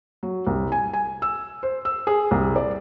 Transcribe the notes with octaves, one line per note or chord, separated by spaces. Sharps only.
F#3
C2
G#5
G#5
E6
C5
E6
G#4
C2
D5